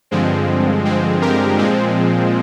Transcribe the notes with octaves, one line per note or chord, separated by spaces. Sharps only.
G2 D3 F3 G#3 C4
G#3 C4
G4 A#4
A#2 F3 G#3 C4